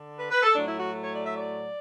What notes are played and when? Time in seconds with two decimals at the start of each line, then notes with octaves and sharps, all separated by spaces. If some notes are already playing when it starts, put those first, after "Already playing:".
Already playing: D3
0.18 B4
0.30 B4
0.43 A4
0.54 A2 F#3 A3 D4
0.66 E4
0.78 F#4
1.03 C#5
1.15 D5
1.25 E5
1.35 D5